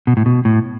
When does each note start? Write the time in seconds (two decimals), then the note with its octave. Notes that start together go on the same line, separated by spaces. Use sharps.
0.07 B2
0.17 A2
0.26 B2
0.45 A2